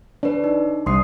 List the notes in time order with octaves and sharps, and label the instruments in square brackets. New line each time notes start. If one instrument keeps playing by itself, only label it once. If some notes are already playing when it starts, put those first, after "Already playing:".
[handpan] D4 [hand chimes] B4 C#5
[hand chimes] D#4
[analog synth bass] C2 [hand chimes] C6 D#6 C7